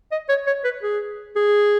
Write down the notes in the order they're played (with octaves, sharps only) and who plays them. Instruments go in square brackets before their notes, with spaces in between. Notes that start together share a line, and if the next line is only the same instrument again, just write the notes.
[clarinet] D#5
C#5
C#5
B4
G#4
G#4